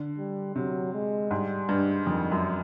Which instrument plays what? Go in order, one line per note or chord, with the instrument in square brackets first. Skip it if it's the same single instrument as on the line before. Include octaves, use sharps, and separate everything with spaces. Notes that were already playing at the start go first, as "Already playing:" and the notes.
Already playing: [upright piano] D3
[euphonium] G3
[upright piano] C3 [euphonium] F#3
[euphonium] G#3
[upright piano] G#2 [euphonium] G3
[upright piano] G2
[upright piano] F2 [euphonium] D#3
[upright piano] F#2